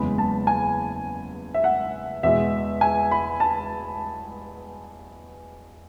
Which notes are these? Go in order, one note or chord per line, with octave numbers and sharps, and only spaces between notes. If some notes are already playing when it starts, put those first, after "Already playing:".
Already playing: F#1 E2 C#3 G#3 B5
A5
G#5
E5
F#5
E2 B2 G#3 E5
G#5
B5
A5